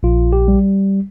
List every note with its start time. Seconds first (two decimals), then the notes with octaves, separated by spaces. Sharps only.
0.03 A#1 F4
0.33 G4
0.48 G3